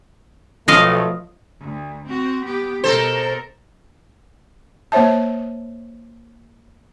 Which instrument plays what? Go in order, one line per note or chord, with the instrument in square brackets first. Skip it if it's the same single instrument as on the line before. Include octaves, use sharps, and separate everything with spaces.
[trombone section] B1 A3 [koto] F3 D#5 F5
[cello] D2
C4 F#4
B3 G4
[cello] B2 A#4 [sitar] A4 C5
[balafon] A#3 C5 C#5 E5 A5